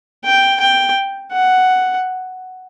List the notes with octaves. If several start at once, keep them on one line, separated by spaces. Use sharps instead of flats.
G5
G5
F#5